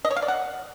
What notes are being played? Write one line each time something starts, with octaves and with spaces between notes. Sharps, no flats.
D#5
C#5
F5
D5
F#5